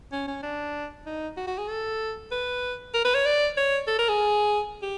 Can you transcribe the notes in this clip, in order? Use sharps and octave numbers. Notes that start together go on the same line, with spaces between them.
C#4
C#4
D4
D#4
F#4
F#4
G#4
A4
B4
A#4
B4
C#5
D5
C#5
A4
A#4
G#4
G4